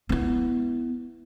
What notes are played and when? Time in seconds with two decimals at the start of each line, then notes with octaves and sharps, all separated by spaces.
0.09 B3 E4